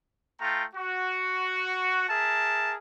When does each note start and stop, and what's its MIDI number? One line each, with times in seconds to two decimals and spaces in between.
0.40 0.64 57
0.40 0.64 65
0.40 0.64 79
0.40 0.64 82
0.76 2.04 66
2.09 2.75 68
2.09 2.75 70
2.09 2.75 76
2.09 2.75 81